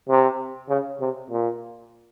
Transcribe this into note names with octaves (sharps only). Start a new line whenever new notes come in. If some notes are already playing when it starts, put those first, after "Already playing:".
C3
C#3
C3
A#2